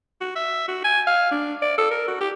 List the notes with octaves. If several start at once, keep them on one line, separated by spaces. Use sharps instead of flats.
F#4
E5
F#4
G#5
F5
D4
D5
A4
A#4
F#4
G4